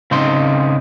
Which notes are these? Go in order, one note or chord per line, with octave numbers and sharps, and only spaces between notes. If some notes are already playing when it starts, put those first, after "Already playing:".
C#3 C4 D#4 C6